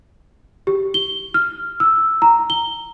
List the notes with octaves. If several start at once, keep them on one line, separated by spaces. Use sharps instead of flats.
G4
G7
F6
E6
A#5
G7